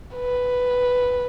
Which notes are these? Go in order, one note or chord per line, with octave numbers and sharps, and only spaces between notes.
B4